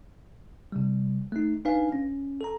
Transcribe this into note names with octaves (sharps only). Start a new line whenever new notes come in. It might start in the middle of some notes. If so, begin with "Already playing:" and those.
C3 G3
A3 D#4
D4 D#4 B4 F5 G#5
C#4
A4 A#5